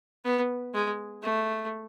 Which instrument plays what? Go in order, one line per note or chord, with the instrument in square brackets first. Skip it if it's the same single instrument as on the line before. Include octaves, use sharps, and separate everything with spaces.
[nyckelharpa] B3
G#3
A3